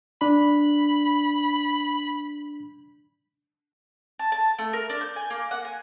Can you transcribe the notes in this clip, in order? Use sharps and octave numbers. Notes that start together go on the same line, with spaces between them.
D4 B5
A5
A5
A3
A#4
D4
G6
G#5
A#3
F#5
G#5